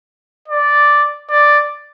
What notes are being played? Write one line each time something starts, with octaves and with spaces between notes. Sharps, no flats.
D5
D5